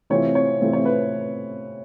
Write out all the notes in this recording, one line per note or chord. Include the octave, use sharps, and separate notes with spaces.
C3 E3 A3 C4 F4 C#5
C#5
C3 E3 A3 C4 F4
C#5
B4